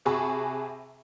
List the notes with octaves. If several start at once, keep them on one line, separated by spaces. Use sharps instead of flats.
C3 F#4 G#4 A5 B5 C#6